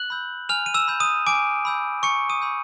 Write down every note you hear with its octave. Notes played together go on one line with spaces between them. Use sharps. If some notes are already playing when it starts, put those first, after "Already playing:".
Already playing: F#6 F#7
B5 E6 G6
G#5 F6 F7
D#7
E6 E7
B5 E6 G6
D#6 D#7
G#5 D6 D7
B5 E6 G6
G#5 C#6 C#7
D#6 D#7
B5 E6 G6